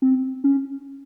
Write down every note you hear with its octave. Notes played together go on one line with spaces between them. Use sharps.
C4
C#4